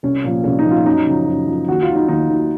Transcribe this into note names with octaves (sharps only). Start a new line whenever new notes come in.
C2 C#4
A#2 F3
C2 C#4
D#4
A#2 F3
F4
F#2 D#4
C#3 F3
F#2
C#3 F3
D#2 F#4
F4
D#3 F#3
D#4
D#2 D#4
D#3 F#3